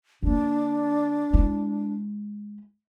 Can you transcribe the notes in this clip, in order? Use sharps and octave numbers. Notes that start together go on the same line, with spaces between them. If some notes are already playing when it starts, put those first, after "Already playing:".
D3 A#3 D4
G#3 E4